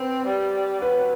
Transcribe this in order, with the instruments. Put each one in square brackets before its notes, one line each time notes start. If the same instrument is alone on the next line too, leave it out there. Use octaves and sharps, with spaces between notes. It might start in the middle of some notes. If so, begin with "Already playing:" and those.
Already playing: [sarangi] C4 [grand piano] B4 C5
[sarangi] G3
[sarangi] F#3 [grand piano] B4